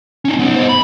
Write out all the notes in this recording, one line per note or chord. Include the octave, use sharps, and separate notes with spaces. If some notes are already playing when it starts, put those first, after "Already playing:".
C#4 D#4
B3 D#4
C5 D#5
B5